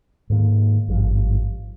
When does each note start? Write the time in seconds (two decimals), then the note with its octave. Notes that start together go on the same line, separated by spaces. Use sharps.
0.30 G#2 D#3 A#3
0.88 G#1 G2 F3